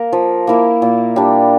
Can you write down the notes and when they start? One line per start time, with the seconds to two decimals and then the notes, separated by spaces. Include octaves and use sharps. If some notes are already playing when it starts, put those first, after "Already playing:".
Already playing: A#3 A#4
0.12 F3
0.47 A#3 E4 A#4
0.82 A#2
1.16 G3 D4